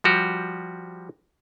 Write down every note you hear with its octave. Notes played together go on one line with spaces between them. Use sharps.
F3 G3 F#4 G4